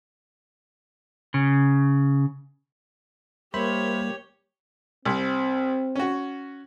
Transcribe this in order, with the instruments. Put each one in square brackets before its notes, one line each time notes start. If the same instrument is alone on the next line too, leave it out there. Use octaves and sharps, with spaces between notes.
[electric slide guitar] C#3
[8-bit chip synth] G3 A#3 [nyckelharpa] G4 C#5 [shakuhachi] A#4 [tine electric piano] C5 E5 B5
[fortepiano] C2 [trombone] C4
[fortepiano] C#4 F#4